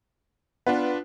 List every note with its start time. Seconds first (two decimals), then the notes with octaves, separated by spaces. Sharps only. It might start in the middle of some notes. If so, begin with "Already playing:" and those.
0.67 B3 D4 F4 B4